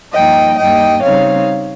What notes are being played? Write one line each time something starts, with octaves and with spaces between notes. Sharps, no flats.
G2 F3 A#3 D#4 D#5 G5
G2 G3 A#3 D#4 D#5 G5
C#3 G3 C4 D#4 C#5 F5